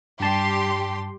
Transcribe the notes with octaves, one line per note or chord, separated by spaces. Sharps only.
G2 G3 G4 A5 C6